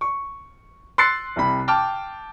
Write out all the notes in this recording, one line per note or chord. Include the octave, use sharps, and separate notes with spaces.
C#6
C6 E6 F#6 A6 C7 C#7
C2 C3 B5
G5 A5 D6 F6